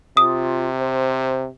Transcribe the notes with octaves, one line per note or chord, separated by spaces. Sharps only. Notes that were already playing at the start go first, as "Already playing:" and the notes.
C3 F4 D#6
C5